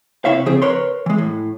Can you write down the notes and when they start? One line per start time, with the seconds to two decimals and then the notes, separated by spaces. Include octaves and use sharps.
0.25 C3 E4 C#5 E5 F5
0.46 C#3 F3 C4 G#4
0.62 A#4 B4 C#5 C6
1.06 E3 G#3
1.18 A2